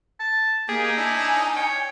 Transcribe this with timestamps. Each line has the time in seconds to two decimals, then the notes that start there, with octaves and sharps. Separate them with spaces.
0.20 A5
0.69 A#3 D#4 G4 G#4
0.97 D4 E4 G#5
1.56 C#5 G5